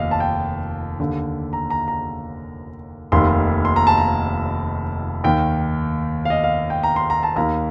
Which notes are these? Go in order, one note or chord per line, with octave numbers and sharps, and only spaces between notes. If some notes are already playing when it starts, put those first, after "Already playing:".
Already playing: F1 D#2 D#5 F5
A5
G5
D#2 D3
A#5
A#5
A#5
F1 D#2 D#3 C6
C6
A#5
A5
A#5
D#2 D#3 G5
F5
D#5
F5
G5
A#5
C6
A#5
A5
D#2 D#3 A#5